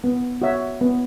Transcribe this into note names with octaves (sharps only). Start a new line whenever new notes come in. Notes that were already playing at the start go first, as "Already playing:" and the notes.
B3
F#4 C#5 E5
B3